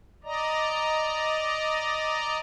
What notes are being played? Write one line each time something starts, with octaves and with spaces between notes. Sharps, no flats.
D5 D#5 A#5